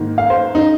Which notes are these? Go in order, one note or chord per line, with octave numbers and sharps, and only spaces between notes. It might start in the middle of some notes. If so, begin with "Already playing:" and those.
Already playing: G#2 D#3 A#3
F5
C5
D#4